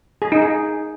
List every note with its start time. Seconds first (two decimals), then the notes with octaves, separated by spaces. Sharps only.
0.22 G#4
0.32 D#4
0.42 G#4